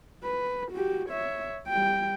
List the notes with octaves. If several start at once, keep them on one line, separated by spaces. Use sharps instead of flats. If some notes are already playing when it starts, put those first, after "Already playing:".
B4
F#4 G4
C#5 E5
G3 G5